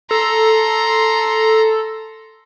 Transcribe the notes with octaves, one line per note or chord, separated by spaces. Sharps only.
A4 A#5 C6